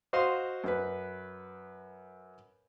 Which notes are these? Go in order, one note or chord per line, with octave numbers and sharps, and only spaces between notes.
F#4 C5 D#5 F5 C6 D#6
F#2 B4